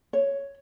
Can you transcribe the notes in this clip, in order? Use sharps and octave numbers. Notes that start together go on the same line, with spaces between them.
C#5